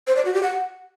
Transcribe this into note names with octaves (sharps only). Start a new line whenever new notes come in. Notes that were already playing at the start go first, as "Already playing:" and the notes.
C5
D5
F#4
G4
F#5